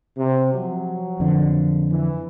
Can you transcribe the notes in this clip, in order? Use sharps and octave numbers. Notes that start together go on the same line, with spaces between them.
C3
F3 F#3
F2 D3
E3